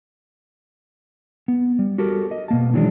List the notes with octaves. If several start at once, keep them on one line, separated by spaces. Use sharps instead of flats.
B3
G3
F#4 G4 A4 A#4
D#5
B2 A#3 A5
D#3 E3 F#3 G#3 D4